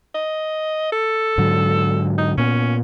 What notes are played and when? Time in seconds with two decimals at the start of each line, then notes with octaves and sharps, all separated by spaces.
0.14 D#5
0.92 A4
1.38 G#2 D3 F#3
2.18 D#4
2.38 A#2 B3 C#4